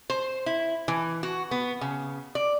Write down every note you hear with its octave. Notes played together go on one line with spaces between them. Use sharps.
C5
E4
E3
F#4
B3
C#3
D5